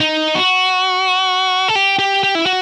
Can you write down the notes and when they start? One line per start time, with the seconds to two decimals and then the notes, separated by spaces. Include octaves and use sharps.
0.01 D#4
0.35 F#4
1.68 A4
1.76 G4
1.99 G4
2.23 G4
2.35 E4
2.46 F#4